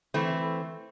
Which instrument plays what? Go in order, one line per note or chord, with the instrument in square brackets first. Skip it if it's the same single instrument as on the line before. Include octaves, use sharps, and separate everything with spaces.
[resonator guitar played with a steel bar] E3 A3 C4